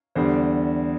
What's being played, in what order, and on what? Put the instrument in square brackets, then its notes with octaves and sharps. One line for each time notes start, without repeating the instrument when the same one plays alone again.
[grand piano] E2 D3 G3 C5